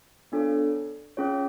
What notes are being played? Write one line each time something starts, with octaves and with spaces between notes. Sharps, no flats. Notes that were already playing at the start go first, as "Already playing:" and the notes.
B3 D4 F4 A4 C#5
C#4 F4 G#4 C#5